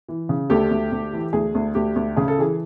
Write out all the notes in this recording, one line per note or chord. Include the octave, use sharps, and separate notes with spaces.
E3
C#3
D2 G4 A4
D2
D2
E3
D2 G#4
D2
D2 G4
D2
C#3 G#4
A4
E3 G#4